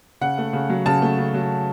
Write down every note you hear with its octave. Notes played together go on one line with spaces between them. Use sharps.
C#3 F#5
A3
C#3
F#3
C#3 A5
A3
C#3
F#3